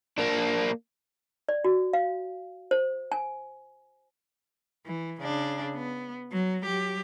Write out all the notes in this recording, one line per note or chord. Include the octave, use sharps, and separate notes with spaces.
A#3 D4
D5
F#4
F5
C5
G#5
E3
C#3 D4
B3
F#3
F#3 G4